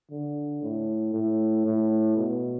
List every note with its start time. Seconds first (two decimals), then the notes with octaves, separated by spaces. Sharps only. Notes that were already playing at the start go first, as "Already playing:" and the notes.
0.11 D3
0.63 A2
1.14 A2
1.65 A2
2.17 B2